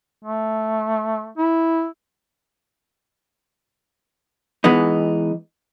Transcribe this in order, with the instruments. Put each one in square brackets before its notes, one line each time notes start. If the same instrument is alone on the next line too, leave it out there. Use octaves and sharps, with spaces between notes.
[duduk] A3
E4
[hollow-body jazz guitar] E3 G#3 B3 D#4